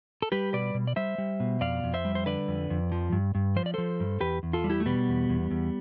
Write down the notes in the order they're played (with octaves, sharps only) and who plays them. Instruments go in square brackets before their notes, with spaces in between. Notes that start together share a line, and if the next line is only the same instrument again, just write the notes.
[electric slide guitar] A4
G3 G4 B4
B2 B4 D5
B2
D5
G3 C5 E5
G3
B2
F2 D5 F5
F2
C5 E5
G3
C5
D3 B4 D5
F2
F2
F3
G2
G2
F3 C5
D5
F3 A4 C5
G2
E2 G4 B4
E2
F4 A4
G3
E4 G4
A3
B2 G3 B3
E2
E2
E2